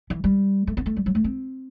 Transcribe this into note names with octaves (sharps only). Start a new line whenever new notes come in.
E3
G3
A3
B3
A3
G3
F#3
A3
C4